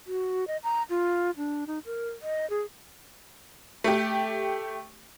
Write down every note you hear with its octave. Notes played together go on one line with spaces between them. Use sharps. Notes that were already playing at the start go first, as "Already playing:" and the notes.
F#4
D#5
A#5
F4
D4
D#4
A#4
D#5
G#4
A3 G4